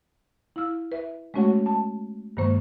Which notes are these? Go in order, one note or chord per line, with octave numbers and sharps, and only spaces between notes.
E4 F5 E6 F6
B4 E5
G#3 A3 C#4 F#4 C#5 F#5
A5
G2 D#3 G#3 A#3 C5 C#6